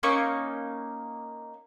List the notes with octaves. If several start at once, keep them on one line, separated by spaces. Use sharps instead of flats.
A#3 C#4 D#4 C#6